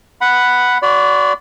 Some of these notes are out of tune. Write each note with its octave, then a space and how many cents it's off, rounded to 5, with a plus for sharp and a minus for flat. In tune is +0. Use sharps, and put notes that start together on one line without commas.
F#5 +0 B5 +0
F#4 +0 D5 -20 B5 +45